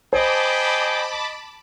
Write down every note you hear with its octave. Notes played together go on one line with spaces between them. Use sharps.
G#4 C5 D#5 G5 A5 B5 D6